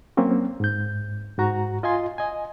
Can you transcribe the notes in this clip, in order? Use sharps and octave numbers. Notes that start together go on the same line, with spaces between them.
F#3 A#3 C4 C#4
G#2 G6
G#2 F#4 A#5
F4 D#5 F5 G#5 C6
D#5 G#5